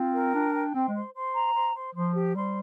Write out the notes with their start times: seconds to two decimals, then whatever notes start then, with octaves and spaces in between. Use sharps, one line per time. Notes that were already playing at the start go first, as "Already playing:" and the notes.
Already playing: C4 F4
0.13 A#4
0.34 D4 G5
0.54 G5
0.74 C4 C5
0.88 G#3
0.94 C5
1.15 C5
1.35 A#5
1.54 C5
1.74 C5
1.95 F3 C5
2.15 G4
2.35 G3 C5